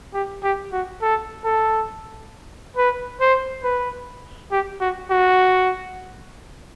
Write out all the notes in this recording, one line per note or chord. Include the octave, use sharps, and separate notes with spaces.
G4
G4
F#4
A4
A4
B4
C5
B4
G4
F#4
F#4